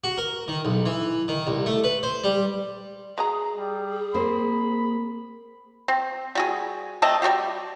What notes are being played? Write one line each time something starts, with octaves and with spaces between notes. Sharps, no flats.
F#4
A#4
D#3
B1
E3
D#3
C2
A3
B4
C5
G3
F#3 G#4 D#5 A#5
G3
A#3 C4 C5 B5
C4
G3 F#4 G#4
A3 C4 D#5 A5
G3 C4 F#4 G4